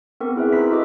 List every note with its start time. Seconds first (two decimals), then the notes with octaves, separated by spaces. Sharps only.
0.20 B3 C4 A#4
0.36 E4 G#4 B4 E5
0.52 D#4 E4 C5 B5 B6
0.71 D#4 F#4 A4 D#5 D6